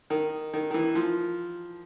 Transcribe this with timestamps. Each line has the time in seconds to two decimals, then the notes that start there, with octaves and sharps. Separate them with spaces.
0.10 D#3
0.53 D#3
0.71 D#3
0.74 E3
0.95 F3